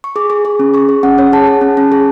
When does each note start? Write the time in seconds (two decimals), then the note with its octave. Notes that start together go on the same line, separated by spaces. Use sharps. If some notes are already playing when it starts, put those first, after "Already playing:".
0.04 C#6
0.16 G#4 D6
0.30 G#4
0.45 G#4
0.59 C#4
0.74 G#4 C#6
0.89 G#4
1.03 C#4 F#5
1.18 C#4 C#5
1.32 G#4 A5
1.47 G#4
1.61 C#4
1.77 C#4
1.92 G#4